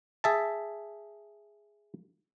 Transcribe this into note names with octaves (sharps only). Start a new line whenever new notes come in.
G#4 E5 A5